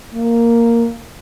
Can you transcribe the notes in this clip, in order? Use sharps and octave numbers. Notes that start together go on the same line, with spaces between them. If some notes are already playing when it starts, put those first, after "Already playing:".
A#3